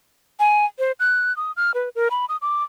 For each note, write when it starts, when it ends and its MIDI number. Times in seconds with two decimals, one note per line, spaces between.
0.40 0.65 80
0.79 0.92 72
1.00 1.35 90
1.37 1.52 87
1.57 1.72 89
1.74 1.89 71
1.95 2.08 70
2.11 2.25 83
2.29 2.37 87
2.42 2.64 86